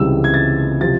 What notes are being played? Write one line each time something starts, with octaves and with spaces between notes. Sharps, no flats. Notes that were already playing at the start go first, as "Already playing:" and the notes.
Already playing: C#2 C3 E3 G3 E6
G#6
A6
C3 F3 A6